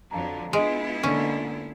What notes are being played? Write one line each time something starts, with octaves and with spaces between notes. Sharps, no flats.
F2 D3 F#3 F5 A5 A#5
G#3 B3 D4 E4 F4 D#5 D7
D3 A#3 C#4